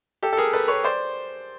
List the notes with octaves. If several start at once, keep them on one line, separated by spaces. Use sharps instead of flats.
G4 A4
A4
G#4 A#4
A4 B4
B4 C#5
C5 D5